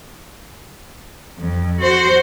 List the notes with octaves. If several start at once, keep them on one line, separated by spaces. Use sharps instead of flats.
F2
F#4 C5